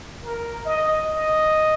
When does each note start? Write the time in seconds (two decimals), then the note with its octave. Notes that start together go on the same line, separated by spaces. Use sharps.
0.23 A#4
0.65 D#5
1.06 D#5